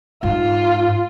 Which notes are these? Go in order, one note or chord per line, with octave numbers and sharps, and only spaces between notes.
G#2 F4